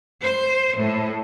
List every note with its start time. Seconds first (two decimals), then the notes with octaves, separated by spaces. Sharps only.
0.22 C5
0.77 A2